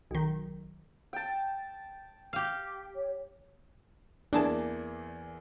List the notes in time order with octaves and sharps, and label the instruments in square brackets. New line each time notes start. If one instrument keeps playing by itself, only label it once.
[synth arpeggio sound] B1 D#3
[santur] G5 A5
[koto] G4 F5
[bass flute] C#5
[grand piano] E2 E3 A#3 [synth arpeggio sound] D4 G#4 A5 [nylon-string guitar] D5